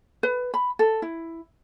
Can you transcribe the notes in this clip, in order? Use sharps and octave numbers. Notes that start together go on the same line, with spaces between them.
B4
B5
A4
E4